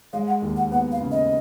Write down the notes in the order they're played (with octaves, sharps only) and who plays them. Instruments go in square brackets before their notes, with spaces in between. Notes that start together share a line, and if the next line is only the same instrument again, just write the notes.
[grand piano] G#3 [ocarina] F5
[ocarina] F#5
[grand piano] D#2
[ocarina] F#5
[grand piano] B3 [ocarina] F#5
[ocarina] F5
[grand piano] C#3
[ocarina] D#5